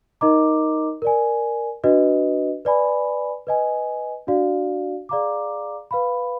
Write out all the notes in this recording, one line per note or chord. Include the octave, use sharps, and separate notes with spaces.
D#4 A#4 D#5 A#5 D6
A#4 D5 G#5
D4 F#4 B4 D#5
B4 D5 G#5 B5
B4 D#5 G#5
D4 F#4 D5 F5
G#4 D5 F5 A#5 D6
B4 F5 B5